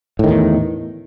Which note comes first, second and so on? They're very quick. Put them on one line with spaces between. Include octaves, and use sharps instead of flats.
A2 D#3 E2